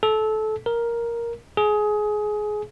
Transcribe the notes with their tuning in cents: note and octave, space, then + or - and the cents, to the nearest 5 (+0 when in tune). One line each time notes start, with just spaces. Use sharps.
A4 -20
A#4 +5
G#4 +20